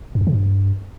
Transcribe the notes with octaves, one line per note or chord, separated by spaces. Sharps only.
F#2
F2
C#3
G2